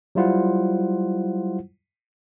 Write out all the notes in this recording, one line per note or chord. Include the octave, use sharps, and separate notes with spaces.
F#3 G3 E4 F4 C5 F#5